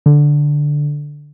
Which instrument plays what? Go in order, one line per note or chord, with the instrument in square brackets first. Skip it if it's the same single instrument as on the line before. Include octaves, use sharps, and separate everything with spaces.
[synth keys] D3